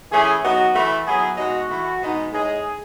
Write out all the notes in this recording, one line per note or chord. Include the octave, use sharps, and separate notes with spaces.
E3 A3 C#4 E4 G#4
F#3 B3 D#4 F#4
E3 A3 E4
F#3 B3 E4 G#4
B2 G#3 D#4 F#4
E3 A3 E4
B2 G#3 B3 D#4
A2 G#3 D#4 G#4